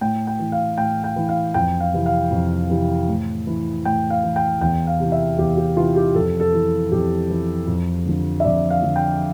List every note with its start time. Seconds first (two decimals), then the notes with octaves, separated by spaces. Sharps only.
0.01 A2 G5
0.27 G5
0.39 E3
0.52 F5
0.78 A2 G5
1.04 G5
1.16 E3
1.29 F5
1.54 F2 G5
1.80 F5
1.93 C3 E3
2.06 F5
2.31 F2
2.70 C3 E3
3.08 A2
3.47 E3
3.85 A2 G5
4.10 F5
4.23 E3
4.36 G5
4.61 E2 G5
4.87 F5
5.00 C3 E3
5.12 E5
5.38 E2 G4
5.57 G4
5.76 C3 F4
5.80 E3
5.96 G4
6.15 F2 A4
6.40 A4
6.52 E3
6.92 F2 G4
7.30 E3
7.68 F2
8.06 D3 F3
8.40 E5
8.44 F2 D5
8.70 F5
8.83 D3 F3
8.96 G5